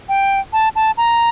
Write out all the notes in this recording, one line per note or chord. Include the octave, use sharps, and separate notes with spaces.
G5
A5
A5
A#5